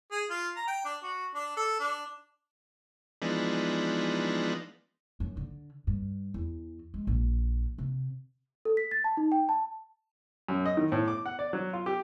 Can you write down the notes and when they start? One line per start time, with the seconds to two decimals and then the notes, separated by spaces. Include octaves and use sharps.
0.11 G#4
0.30 F4
0.56 A#5
0.67 G5
0.84 D4
1.03 F#4
1.34 D4
1.57 A4
1.80 D4
3.22 E3 F3 G#3 B3 D4 D#4
5.20 F#2
5.37 D3
5.87 G2
6.34 E2
6.94 G#3
7.07 A#1
7.78 C3
8.65 A4
8.77 B6
8.91 A6
9.04 A5
9.17 D#4
9.32 G5
9.49 A5
10.49 F#2
10.65 D#5
10.77 D#3
10.92 A2
11.08 D6
11.26 F#5
11.39 D5
11.53 F#3
11.73 F4
11.86 G4